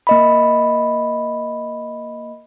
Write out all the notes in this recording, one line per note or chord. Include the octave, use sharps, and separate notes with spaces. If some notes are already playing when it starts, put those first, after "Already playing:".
A#3 D#5 B5